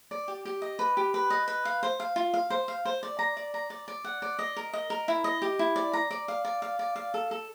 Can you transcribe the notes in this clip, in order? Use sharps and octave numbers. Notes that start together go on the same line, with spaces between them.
D5
G4
G4
D#5
B4
G4
B4
D#5
B4
F5
C5
F5
F4
F5
C5
F5
C5
D5
A#5
D5
A#5
D5
D5
F#5
D5
D#5
A#4
D#5
A#4
E4
D#5
G4
E4
D5
A#5
D5
F5
D5
F5
D5
F5
A4
A4